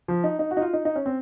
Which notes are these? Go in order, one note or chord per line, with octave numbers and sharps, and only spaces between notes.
F3
D#4
D#4
F#4
D#4
F4
D#4
D#4
C#4
C4